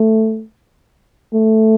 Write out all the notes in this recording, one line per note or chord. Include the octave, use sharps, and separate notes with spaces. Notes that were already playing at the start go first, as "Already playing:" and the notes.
Already playing: A3
A3